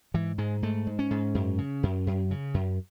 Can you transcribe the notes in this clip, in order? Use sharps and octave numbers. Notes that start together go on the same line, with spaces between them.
G#2 E3
G#2 G#3
G#2 A3
G#2
C#4
G#2
F#2
C#3
F#2
F#2
C#3
F#2